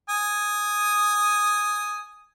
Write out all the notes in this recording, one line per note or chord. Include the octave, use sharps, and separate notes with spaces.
G#5 D#6